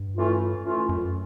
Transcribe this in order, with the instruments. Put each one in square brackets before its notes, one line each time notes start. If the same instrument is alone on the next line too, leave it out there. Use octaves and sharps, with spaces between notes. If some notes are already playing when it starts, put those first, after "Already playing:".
Already playing: [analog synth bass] G2
[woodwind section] A2 E3 A3 C#4 F4
A2 E3 A3 C#4 F4
[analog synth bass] F#2